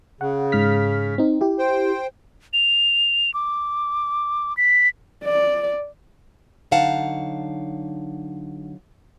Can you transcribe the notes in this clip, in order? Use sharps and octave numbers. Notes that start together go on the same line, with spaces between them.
C#3 F#5
G#2 F6 B6
C4 D#4
E4 G4
C5 G5
F7
D6
B6
D5
D3 F#3 D#4 F5 F#5 A5